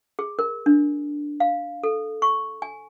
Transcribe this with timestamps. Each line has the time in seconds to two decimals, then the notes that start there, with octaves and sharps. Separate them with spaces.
0.19 G#4
0.39 A#4
0.66 D4
1.40 F5
1.83 A4
2.22 C#6
2.62 G#5